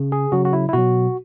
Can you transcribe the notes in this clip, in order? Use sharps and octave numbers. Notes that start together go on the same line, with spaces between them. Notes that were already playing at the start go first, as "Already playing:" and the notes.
Already playing: C#3
G#4
C#3 F#3 F#4
F#4
E4
E4
B2 F#3 F#4